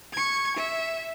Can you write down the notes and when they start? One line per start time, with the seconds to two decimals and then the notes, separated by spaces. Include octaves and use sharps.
0.13 C#6 G#6
0.57 E5